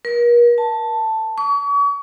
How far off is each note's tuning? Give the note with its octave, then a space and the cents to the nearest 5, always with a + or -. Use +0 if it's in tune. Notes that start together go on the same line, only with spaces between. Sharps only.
A#4 +40
A5 +5
C#6 +40